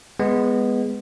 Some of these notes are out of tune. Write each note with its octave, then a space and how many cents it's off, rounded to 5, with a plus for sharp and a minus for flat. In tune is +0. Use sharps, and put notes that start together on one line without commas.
G#3 +0 B3 +5